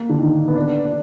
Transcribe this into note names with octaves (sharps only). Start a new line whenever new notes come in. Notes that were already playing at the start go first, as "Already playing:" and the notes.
Already playing: A#3
D3
D#3
B3
D4
D4